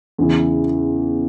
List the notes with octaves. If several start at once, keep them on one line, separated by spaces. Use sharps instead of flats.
E2 C#3 E3